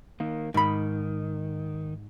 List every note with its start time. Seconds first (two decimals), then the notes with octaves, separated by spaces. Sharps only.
0.20 D#3 A#3
0.54 G#2 D#3 B5